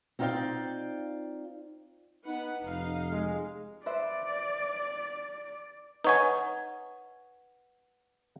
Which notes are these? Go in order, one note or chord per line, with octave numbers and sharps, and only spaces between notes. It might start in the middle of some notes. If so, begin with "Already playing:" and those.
C4 D#4 F4 D5 F5 G5
B3 D#4 B4 F#5
F1 D#4 F5
G#3
B4 C5 D5 E5
D#4 B4 C#5 F#5 G#5